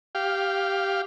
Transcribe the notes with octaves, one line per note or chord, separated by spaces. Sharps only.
G4 F5